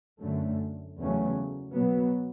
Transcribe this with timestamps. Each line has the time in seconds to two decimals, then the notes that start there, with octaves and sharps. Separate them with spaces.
0.23 F#2 D3 A3
1.01 E2 C#3 F#3 A3 C#4
1.76 B2 F#3 B3